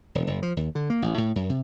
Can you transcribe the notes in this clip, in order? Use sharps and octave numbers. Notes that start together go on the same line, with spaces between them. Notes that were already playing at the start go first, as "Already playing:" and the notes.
E1
F#1
F3
D#2
D3
A#3
A1
A2
F#2
C3